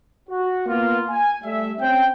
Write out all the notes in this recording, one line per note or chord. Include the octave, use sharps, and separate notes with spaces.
F#4
A#3 B3 F4
G#5
G3 A3 E5
C4 C#4 G5